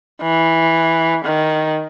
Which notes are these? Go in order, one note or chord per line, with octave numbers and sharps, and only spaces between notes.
E3
D#3